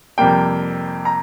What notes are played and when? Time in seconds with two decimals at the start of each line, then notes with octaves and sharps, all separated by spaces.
0.18 F2 C3 G3 A#3 G5
1.05 A#5